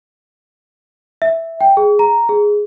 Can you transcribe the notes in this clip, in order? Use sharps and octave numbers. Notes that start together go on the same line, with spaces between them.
E5
G5
G#4
A#5
G#4